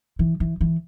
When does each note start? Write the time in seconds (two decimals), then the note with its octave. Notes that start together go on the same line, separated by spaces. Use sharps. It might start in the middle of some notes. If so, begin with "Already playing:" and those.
0.19 E3
0.40 E3
0.61 E3